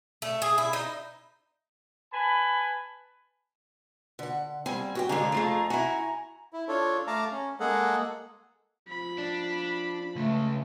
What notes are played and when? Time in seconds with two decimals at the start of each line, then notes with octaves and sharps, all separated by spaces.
0.22 A3
0.42 G#4
0.58 E4
0.73 D#4
2.12 B4 G#5 A5 B5
4.19 D3 F#5
4.66 G3 A#3 C4 G#5
4.95 F#4 G4 G5
5.09 F2 D3 G#3 F5 G#5 A#5
5.32 A3 F4 G#4
5.70 E4 F#4 G#5 A#5
6.53 E4
6.68 D4 F4 A4 C#5
7.07 A3 F5 A5 A#5 D6
7.31 C#4
7.60 G#3 A#3 G#4 A4 F#5
8.88 F3 B5
9.18 D4
10.16 C#2 C#3 A3